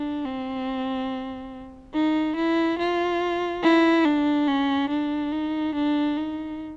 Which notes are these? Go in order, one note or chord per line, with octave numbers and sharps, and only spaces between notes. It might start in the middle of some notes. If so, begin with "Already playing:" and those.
Already playing: D4
C4
D#4
E4
F4
E4
D4
C#4
D4
D#4
D4
D#4